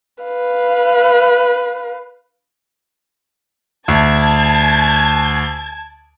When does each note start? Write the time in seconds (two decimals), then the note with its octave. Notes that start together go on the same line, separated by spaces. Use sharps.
0.24 B4 F5
3.88 D2 A5 G#6